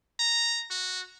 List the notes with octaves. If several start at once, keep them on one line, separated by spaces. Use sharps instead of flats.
A#5
F#4